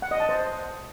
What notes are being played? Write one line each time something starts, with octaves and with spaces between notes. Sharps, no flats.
F#5
D#5
A5
C5